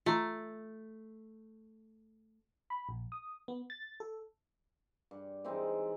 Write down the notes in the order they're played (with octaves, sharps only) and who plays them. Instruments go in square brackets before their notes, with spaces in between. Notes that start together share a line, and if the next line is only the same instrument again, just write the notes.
[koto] A3 [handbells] F4 A#5
[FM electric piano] B5
A#1
D#6
B3
A6
A4
[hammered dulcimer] G2
E3 G#3 C4 D#4